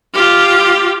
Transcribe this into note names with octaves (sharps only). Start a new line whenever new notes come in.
F4 G4